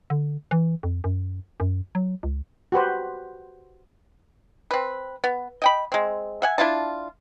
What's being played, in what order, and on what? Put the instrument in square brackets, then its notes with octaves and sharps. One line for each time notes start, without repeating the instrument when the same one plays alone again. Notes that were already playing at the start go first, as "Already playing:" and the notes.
[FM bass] D3
E3
F2
F#2
F#2
F#3
C#2
[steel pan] F#4 G4 B4 C5
[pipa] C4 B4
B3
D#5 G5 B5
G#3 C4
E5 F#5 G#5
D4 E4 F4 A5